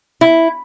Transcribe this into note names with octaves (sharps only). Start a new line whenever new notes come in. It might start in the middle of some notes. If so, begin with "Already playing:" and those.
E4